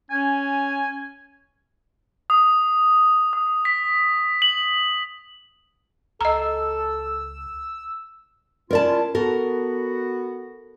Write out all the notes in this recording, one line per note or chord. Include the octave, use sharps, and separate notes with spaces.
C#4 G#5
D#6
D#6
B6
F#7
C#2 A4 D#5 A#5 E6
C#4 E4 F4 A#4 D5 A5
B3 F#4 A4 A#4